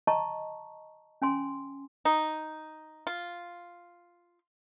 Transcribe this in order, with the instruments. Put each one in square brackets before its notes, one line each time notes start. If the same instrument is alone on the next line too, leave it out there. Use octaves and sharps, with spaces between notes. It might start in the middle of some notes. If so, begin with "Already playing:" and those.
[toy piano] D#5 A5 A#5 C#6
C#4 G#5 C6
[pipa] D#4
F4